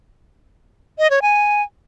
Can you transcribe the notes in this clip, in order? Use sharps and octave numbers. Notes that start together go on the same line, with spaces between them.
D#5
C#5
G#5